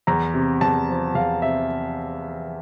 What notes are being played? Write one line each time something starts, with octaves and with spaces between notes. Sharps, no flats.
E2 A#5
C3
E2 A5
F3
E2 F5
C3 E5